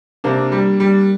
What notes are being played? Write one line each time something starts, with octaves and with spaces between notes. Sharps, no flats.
C3 A#3 D4
G3
G3